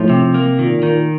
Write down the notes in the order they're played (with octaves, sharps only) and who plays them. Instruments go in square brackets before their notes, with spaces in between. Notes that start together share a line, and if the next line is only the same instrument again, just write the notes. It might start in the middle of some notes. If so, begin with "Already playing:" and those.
Already playing: [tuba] A2 [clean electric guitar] F3
[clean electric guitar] C3
A#3
[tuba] A#2 [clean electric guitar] D#3
[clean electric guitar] D#3